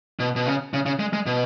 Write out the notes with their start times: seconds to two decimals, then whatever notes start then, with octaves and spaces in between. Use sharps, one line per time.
0.20 B2
0.36 B2
0.46 C#3
0.74 C#3
0.86 C#3
1.00 G#3
1.13 G#3
1.26 B2